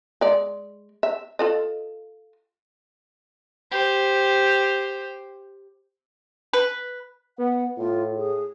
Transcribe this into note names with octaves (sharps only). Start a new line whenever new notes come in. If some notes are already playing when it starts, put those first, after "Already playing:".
G#3 D5
E5
F4 A4 D#5
G4 C5
B4
B3 F#5
A2 F4
G#4